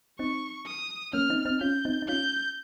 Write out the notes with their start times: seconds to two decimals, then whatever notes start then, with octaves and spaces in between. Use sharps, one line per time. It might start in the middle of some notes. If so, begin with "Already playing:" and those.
0.19 C4 D#4 C#6
0.67 D#6
1.13 A#3 C#4 F6
1.30 C4 D#4
1.45 C4 D#4
1.61 C#4 F4 G6
1.85 C4 D#4
2.02 D#4
2.08 C#4 F4 G6